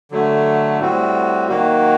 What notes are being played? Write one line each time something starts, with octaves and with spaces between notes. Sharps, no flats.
D3 F#3 A3
A2 G3 C4 F#4
D#3 F#3 A#3 F#4